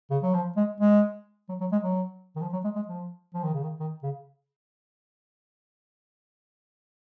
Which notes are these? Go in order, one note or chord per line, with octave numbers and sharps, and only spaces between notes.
C#3
F#3
F3
G#3
G#3
F#3
F#3
G#3
F#3
D#3
F3
F#3
G#3
G#3
F3
F3
D#3
C#3
D#3
D#3
C#3